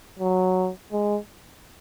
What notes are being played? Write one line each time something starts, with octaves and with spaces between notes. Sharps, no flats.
F#3
G#3